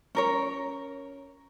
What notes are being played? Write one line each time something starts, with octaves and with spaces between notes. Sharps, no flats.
C#4 A#4 C#5